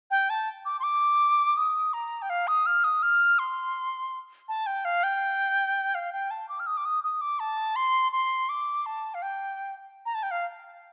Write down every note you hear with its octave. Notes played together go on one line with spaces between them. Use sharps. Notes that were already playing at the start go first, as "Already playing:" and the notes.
G5
A5
D6
C6
D6
D#6
A#5
G5
F5
D#6
F6
D#6
F6
C6
A5
G5
F5
G5
F5
G5
A5
D6
F6
D#6
D6
D#6
D#6
D6
A5
C6
C6
D6
A5
F5
G5
A#5
A5
G5
F5